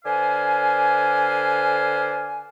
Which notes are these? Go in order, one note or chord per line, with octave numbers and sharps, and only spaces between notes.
D3 B4 C5 D5 F5 G#5